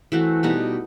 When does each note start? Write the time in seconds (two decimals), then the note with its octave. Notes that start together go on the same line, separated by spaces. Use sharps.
0.12 E3 A3 C4 F#4
0.43 B2 G3 D#4 F#4